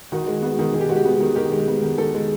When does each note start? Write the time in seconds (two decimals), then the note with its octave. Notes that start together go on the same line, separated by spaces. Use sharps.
0.12 D#3 F#4
0.27 G#3
0.43 B3 F#4
0.59 D#3
0.73 D#3 G#4
0.81 G4
0.89 G#3 F#4
0.96 G4
1.05 B3
1.20 D#3
1.36 D#3 G4
1.52 G#3
1.68 B3
1.82 D#3
1.98 D#3 A4
2.14 G#3